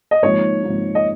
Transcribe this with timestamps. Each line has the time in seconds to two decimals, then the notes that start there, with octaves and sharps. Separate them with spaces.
0.11 D#5
0.23 G#1 G#2 F3 A#3 D#4 C#5
0.63 G#1 G#2 F3 A#3 D#4
0.95 D#5